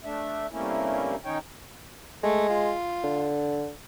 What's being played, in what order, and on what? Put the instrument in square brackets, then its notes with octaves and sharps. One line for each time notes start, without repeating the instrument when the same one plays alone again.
[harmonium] A3 D4 E5
G2 C3 A3 A#3 C#4 E4
D#3 C#4 D#4 C#5 G5
[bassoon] G#3 [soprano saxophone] A3
[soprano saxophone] F4
[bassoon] D3